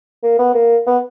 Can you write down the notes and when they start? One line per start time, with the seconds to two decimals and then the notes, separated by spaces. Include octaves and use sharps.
0.23 A#3
0.39 B3
0.54 A#3
0.87 B3